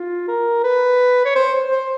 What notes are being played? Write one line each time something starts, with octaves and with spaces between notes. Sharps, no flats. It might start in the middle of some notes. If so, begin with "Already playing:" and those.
Already playing: F4
A#4
B4
C#5
C5
C5